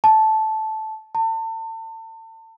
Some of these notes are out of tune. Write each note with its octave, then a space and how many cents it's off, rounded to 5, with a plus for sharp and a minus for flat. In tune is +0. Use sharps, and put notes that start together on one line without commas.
A5 -10
A5 +35